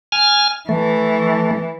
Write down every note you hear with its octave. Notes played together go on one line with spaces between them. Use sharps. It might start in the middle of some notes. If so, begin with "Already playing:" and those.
G#5 F6
E3 A3